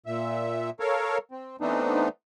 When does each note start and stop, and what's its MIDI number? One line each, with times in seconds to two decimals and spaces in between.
0.06 0.70 46
0.06 0.70 76
0.80 1.18 69
0.80 1.18 70
0.80 1.18 73
0.80 1.18 77
1.31 1.56 60
1.61 2.08 52
1.61 2.08 57
1.61 2.08 59
1.61 2.08 60
1.61 2.08 62
1.61 2.08 63